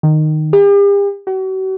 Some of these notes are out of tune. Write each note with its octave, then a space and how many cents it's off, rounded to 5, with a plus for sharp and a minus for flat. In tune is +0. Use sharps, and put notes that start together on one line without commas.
D#3 -15
G4 +40
F#4 +40